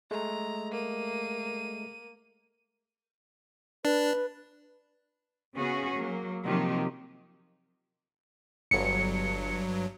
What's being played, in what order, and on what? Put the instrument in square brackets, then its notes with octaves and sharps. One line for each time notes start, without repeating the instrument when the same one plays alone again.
[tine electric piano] G#3 A3 [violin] A#5
[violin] A#3 D#7
[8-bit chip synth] D4 [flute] B4
[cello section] C#3 B3 C#4 F#4 G#4
F#3 A#3
C3 D#3 F3 F#3 A#3 G4
[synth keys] G1 C#7 [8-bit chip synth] G2 F#3